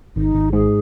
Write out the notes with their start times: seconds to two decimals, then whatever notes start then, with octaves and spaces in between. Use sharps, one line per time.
0.16 G#1 D#4
0.35 G#1
0.53 G#2 G#4